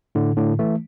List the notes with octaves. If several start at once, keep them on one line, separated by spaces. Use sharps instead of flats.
A2 D3
A2 D3
E3 A3